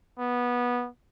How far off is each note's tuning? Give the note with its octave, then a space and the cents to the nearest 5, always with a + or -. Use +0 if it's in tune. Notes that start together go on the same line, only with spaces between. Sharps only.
B3 -15